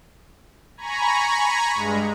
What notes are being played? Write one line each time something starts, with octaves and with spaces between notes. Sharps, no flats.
G#5 A#5 B5 C#6
G2 G#3